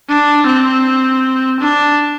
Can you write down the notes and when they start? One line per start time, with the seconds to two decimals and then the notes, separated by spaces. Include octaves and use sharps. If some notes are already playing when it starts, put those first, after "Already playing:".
0.09 D4
0.46 C4
1.60 D4